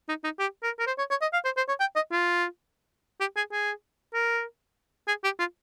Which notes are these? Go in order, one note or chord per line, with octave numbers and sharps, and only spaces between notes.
D#4
D#4
G4
A#4
A#4
C5
C#5
C#5
D#5
F5
C5
C5
C#5
G5
D#5
F4
G4
G#4
G#4
A#4
G#4
G4
F4